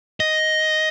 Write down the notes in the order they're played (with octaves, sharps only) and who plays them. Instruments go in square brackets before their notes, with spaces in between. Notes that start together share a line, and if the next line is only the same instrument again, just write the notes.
[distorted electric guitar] D#5